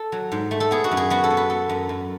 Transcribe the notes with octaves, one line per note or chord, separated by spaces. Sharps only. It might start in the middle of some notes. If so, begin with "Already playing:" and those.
Already playing: A4
F#3
G#2
A3
A4
B3 G#4
F#4
F#2
G#4
B3 F#4
A4
B3
B4
B3 A4
F#2
F#2